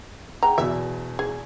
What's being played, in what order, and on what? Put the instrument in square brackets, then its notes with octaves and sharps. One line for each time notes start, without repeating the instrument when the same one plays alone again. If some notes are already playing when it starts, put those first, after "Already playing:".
[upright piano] G#4 F#5 G5 [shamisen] A#5
[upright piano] E2 B2 [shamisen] E5
[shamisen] G#4